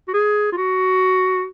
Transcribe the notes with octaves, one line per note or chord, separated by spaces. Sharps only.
F#4
G#4
F4
F#4